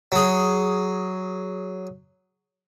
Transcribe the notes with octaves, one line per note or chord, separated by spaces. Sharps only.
F#3 G#4